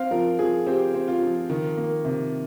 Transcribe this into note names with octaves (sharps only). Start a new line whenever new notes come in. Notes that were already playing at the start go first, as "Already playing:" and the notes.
Already playing: C4 F5
F3 A#4
F3 G#4
C4 G4
C4
F4
F3
D#3
A#3
C3